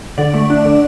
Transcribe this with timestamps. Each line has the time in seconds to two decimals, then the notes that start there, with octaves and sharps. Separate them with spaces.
0.18 D3 D5
0.34 A3
0.50 D4
0.65 D3